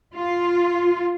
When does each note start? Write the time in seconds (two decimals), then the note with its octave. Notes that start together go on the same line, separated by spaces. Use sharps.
0.14 F4